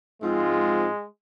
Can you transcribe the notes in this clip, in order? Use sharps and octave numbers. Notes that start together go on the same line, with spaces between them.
G#2 F3 G#3 C4 F4